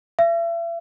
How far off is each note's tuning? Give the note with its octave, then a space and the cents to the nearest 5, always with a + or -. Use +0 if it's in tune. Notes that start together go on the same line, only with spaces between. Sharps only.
E5 +40